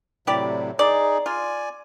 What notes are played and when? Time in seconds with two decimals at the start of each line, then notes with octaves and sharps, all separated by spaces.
0.27 A2 C3 F#3 E4 G4 D5
0.79 D#4 G#4 D5
1.26 F4 D5 G#5